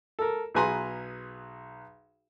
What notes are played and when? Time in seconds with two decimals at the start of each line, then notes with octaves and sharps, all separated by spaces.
0.19 A4 A#4
0.54 B1 G#4 B4 G#5 A#5 C6